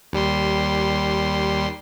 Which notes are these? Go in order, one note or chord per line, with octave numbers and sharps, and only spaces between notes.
D#2 G3 C6